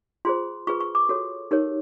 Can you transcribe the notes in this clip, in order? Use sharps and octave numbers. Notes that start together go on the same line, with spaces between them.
F4 G#4 C5 C6
F4 G#4 B4 C#6
C#6
D6
F#4 A4 C#5
D#4 G4 A#4 C#5